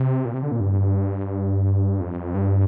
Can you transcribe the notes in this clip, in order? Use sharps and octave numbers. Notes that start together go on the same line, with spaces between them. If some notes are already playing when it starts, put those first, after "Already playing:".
Already playing: C3
A#2
C3
D3
A#2
G2
F2
G2